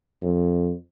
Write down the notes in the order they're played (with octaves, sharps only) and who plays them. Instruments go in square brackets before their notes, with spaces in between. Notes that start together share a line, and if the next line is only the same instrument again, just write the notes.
[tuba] F2